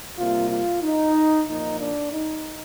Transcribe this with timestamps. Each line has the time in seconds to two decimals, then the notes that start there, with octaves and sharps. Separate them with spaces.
0.18 C3 G3 A#3 F4
0.50 F4
0.83 D#4
1.47 A#2 F3 A#3 D#4
1.80 D4
2.12 D#4